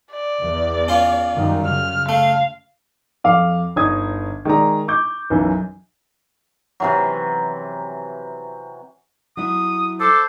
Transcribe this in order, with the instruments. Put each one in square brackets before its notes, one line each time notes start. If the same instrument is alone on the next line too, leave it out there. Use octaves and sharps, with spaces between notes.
[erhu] D5
[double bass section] E2
[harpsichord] C#4 F4
[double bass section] F#2 D#3 G3
[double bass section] C#3 [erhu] F6
[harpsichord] A3 [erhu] F5
[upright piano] F2 F5 D6
G1 D#4 C#5 D#5 D#6 G#6
D#3 G#3 D5 A#5
C#6 D6 G6
B1 F#2 E3
[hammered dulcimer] C3 E3 F#3
[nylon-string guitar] F#3 E4 [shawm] D#6
[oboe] A4 [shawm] C5 [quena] D6